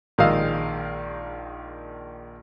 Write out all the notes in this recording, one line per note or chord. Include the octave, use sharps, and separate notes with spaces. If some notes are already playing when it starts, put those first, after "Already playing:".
A#1 D#3 G#3 D#5 F5 E6